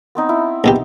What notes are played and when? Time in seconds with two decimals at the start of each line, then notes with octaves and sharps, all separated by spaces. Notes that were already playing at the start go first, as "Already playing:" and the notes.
0.15 B3 C4 D#4
0.29 E4
0.64 A#1 B2 D#4 G4